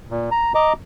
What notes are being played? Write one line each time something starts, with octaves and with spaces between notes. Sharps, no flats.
A#2
A#5
D#5 A#5 D6